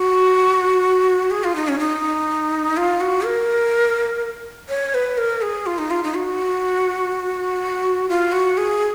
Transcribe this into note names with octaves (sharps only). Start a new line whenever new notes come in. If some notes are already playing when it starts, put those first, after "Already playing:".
Already playing: F#4
G#4
F4
D#4
C#4
D#4
F4
F#4
A#4
C#5
B4
A#4
G#4
F4
D#4
F4
D#4
F#4
F4
F#4
G#4